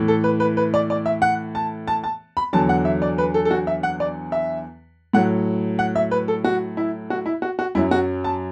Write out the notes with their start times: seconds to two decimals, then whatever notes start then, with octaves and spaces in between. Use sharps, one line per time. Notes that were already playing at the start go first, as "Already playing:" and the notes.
Already playing: A2 E3
0.08 A4
0.24 B4
0.40 B4
0.57 B4
0.74 D5
0.90 D5
1.06 E5
1.22 F#5
1.55 A5
1.88 A5
2.04 A5
2.37 B5
2.53 E2 D3 F#3 A5
2.69 F#5
2.85 E5
3.02 D5
3.18 B4
3.34 A4
3.45 A4
3.51 F#4
3.67 E5
3.83 F#5
4.00 D5
4.32 E5
5.13 A2 F#3 F#5
5.79 F#5
5.96 E5
6.11 B4
6.28 A4
6.44 F#4
6.77 E4
7.10 F#4
7.26 E4
7.42 F#4
7.59 F#4
7.75 F#2 F#3 E4
7.91 F#4
8.24 A5